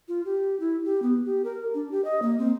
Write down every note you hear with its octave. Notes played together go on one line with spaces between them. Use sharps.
F4
G4
E4
G4
B3
G4
A#4
D4
G4
D#5
A#3
C4